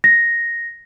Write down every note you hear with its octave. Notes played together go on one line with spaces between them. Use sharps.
A#6